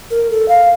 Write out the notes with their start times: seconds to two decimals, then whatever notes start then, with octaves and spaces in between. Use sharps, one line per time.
0.11 A#4
0.30 A4
0.48 F5